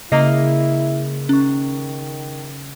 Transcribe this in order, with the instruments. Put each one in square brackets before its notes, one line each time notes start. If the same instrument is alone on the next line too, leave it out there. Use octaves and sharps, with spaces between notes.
[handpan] C#3 [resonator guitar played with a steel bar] A#3 D#5 [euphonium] E4 [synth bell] E5 C7
[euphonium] D#3 [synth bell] C#4 C#6